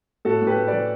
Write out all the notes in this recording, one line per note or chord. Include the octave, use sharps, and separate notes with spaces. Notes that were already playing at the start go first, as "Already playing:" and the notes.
A2 F#4 A4
A2
G4 B4
A2
B4 D5
E3